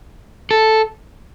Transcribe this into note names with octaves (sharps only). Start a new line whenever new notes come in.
A4